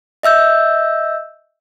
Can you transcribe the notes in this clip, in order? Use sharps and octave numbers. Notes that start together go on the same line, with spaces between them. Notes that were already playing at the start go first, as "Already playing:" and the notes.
D#5 E5 E6 G6